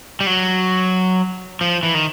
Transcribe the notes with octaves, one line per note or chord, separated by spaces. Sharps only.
G3
F#3
F3
E3
D#3